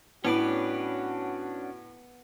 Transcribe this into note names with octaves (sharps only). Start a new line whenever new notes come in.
A2 B3 C#4 D4 F#4 B4 D6